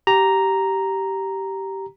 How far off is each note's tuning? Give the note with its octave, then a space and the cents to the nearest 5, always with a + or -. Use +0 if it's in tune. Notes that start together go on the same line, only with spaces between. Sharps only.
G4 -15 A#5 +0